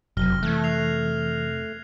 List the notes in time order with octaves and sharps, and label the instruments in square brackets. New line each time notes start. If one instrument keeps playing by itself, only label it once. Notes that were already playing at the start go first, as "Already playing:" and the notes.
[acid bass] F#1 [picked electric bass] F2 C3 [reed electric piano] F#3 [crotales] F6 A#6 G7
[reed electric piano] E3 [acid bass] A3 [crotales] F#6 G#6
[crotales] F#6 C7 F7